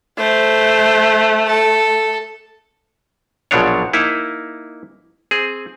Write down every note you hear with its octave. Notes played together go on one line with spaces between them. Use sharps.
A3 C5
A4
A#1 B2 F3 F#3 D4 C#5
A#3 D#4 E4
C4 G#4